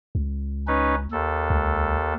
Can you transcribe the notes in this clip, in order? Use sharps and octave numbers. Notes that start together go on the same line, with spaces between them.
C#2
C#4 D#4 B4
D#2 A4
C#2